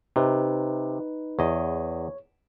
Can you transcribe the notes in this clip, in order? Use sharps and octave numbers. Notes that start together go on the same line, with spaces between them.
C3 D#4 B4
E2 C#5 D#5